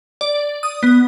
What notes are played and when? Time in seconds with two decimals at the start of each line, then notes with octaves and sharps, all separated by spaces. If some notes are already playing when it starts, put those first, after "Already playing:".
0.21 D5
0.63 D#6
0.83 B3